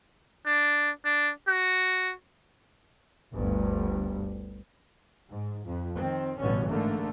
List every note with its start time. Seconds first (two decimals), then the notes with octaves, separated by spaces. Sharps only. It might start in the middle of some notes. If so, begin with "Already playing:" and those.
0.46 D4
1.05 D4
1.48 F#4
3.32 G1 D2 G2
5.29 G#2
5.66 F2
5.97 D#3 C4
6.39 A1 G2 B2 D3 C#4
6.69 G#2 D3 A3 A#3